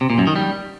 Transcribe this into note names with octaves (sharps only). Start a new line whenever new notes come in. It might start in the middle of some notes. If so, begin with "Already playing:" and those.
C3
A#2
F#2
D#3
G3